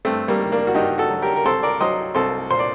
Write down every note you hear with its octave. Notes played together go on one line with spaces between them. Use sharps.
G2 A3 C4
G3 A#3
D#3
A#3 D4
F#4
G2 D#4 G4
F#4 A4
F#3
G4 A#4
A#4
C2 A4 C5
A#4 D5
F#3 C5 D#5
C2 A4 C5
A#2 C5
D5